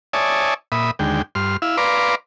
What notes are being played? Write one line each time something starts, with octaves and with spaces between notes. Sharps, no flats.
C#5 D5 E5 G#5 A5 D#6
A#2 E5 B5 D#6
D#2 D3 G#3 G5
G2 C6 F6
E4 F5 E6
B4 D5 F5 A#5 C6 D6